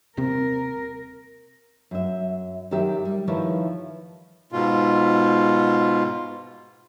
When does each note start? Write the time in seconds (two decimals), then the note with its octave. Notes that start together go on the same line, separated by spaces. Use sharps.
0.17 D#1 C3 C4 A#4
1.91 F#2 E5
2.71 F#2 D#3 F#3 G4 E5
3.05 G3
3.27 D#3 F3 E4 B4 C#5
4.52 G#2 B2 F4